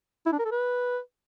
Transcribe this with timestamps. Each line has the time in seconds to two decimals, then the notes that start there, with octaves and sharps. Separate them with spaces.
0.26 E4
0.32 D4
0.39 A#4
0.45 A4
0.51 B4